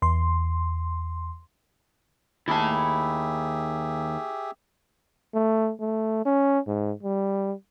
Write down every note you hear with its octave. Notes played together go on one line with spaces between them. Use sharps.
E2 C6
D#2 E4 G4 G#4 E5 A5
A3
A3
C#4
G#2
G3